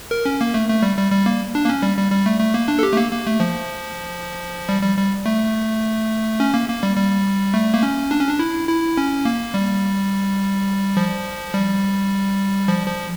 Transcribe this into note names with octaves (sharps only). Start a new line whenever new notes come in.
A#4
C#4
A#3
A3
A3
G3
G3
G3
A#3
D4
A#3
C#4
G3
G3
G3
A3
A3
A#3
D4
A4
G4
A3
A#3
A#3
A3
F3
G3
G3
G3
A3
C#4
A#3
A#3
G3
G3
A3
A#3
C#4
D4
C#4
D4
E4
E4
C#4
A#3
G3
F3
G3
F3
F3